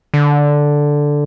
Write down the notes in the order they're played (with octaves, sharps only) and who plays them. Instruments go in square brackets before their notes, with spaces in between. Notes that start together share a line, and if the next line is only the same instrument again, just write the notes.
[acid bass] D3